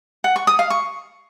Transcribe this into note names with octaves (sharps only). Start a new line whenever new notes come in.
F#5
C#6
D#6
F5
C#6